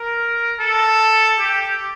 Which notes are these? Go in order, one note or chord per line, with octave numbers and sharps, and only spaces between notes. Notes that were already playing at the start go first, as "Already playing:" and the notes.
Already playing: A#4
A4
G4